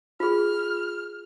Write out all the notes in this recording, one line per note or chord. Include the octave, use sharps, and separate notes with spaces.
F4 G#4 F6